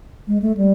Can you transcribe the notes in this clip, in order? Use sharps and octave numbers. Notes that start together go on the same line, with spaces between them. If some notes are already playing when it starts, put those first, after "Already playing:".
G#3
A3
G3